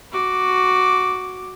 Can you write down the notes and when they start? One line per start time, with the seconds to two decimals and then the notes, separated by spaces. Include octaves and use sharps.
0.12 F#4 D6